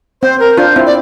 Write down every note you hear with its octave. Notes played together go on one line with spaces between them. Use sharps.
C4 C5
A#4
D4 F4 C5
C4 E4
D5